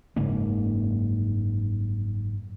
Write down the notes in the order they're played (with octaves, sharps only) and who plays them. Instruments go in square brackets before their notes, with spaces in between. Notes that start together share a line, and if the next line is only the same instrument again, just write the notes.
[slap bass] F#1 G#2 C#3 A#3